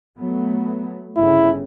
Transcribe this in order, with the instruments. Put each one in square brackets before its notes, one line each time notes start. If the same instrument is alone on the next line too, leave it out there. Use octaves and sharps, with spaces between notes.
[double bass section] F#3 A3 B3
[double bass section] G1 C#3 [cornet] E4